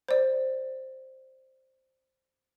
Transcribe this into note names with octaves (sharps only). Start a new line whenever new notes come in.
C5 D5